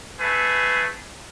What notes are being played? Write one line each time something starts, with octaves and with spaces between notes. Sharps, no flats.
A3 G#4 B4